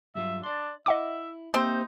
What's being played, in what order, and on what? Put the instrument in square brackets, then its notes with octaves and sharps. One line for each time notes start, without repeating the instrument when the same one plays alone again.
[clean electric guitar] G2 F#3 F4 [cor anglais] E5
[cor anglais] D4 [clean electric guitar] D5 C6
[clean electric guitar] E4 [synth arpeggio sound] D#5 F#5 D6 [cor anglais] E5
[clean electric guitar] A#3 G4 E5 [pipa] C4 C5 [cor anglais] D#4